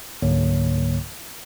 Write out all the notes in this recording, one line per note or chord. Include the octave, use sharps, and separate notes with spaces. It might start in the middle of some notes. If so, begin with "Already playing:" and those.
C#2 G#2 D3 F#3 A#3 C#5